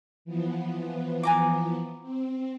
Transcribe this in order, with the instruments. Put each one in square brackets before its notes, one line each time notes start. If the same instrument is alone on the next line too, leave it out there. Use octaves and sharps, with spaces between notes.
[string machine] E3 F3 B3
[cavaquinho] G#5 A#5 D6
[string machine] C4